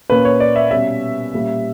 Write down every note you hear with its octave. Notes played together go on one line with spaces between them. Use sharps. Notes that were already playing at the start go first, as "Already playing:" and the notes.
A#2 A#3 C#4 B4
C#5
D5
E5
B2 G3 C#4 E5
A#2 G3 C#4